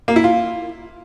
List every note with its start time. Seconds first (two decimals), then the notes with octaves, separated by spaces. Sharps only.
0.08 A#3
0.16 E4
0.24 F4